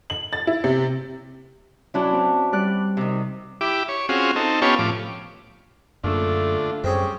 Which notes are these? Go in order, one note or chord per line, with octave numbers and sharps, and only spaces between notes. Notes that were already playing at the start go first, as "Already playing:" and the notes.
F#7
A6
E4
C3
F#3 C#4 D4 E4 F#4
C4
G3 D5 F#6
C3 D#3
E4 G4 D6
C#5
C4 C#4 F4 F#4 G#4
C4 D#4 A4
B3 C#4 F4 G4 A4 C#5
A2 F3 D6
F#2 D3 A3 A#3 D4 F4
F#2 G3 C4 G#4 C#5